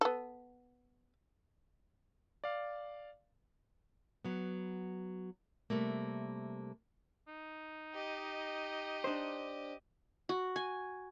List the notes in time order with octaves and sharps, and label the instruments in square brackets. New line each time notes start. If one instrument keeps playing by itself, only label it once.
[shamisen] B3 A4
[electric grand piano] D5 F5
[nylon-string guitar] F#3 B3
C3 G3 A3 A#3
[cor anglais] D#4
[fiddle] G4 D#5
[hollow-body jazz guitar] D4 C5
[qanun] F#4
G#5